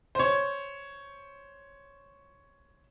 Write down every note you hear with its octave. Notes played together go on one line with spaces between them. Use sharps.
C5 C#5